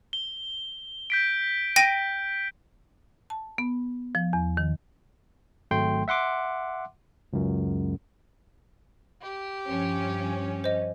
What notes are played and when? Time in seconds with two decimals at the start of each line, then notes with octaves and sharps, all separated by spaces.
0.13 G7
1.10 G6 B6 D7
1.76 G5 A#6 D#7
3.30 A5
3.58 B3
4.15 F3
4.33 E2
4.57 D#3
5.71 G#1 F#3 A3 G5 C6
6.08 E5 F#5 C6 D6
7.33 C#2 F#2
9.23 G4
9.68 G2 F3 C#4
10.64 C5 D#5